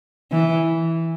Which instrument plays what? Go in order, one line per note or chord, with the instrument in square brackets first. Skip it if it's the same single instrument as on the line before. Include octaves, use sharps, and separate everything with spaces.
[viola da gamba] E3